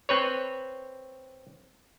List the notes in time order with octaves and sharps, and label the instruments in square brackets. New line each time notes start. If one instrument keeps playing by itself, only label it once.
[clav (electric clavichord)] C4 B4 C#5